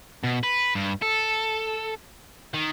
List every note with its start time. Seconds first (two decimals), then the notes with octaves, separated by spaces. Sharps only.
0.24 B2
0.43 B4
0.75 G2
1.02 A4
2.54 D#3